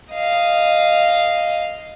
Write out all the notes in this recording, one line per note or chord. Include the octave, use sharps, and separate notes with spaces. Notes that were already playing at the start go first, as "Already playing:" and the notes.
D#5 F5